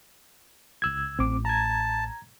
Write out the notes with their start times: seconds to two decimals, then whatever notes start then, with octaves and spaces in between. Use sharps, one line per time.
0.82 C#2 E6 G#6
1.19 A1 C4 D6
1.45 A5 A#5 G#6